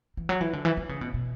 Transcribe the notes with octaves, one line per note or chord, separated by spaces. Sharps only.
E3
F#3
E3
D3
E3
E3
C#3
B2
B2